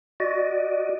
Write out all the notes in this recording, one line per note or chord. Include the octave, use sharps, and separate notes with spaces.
F#4 D5 D#5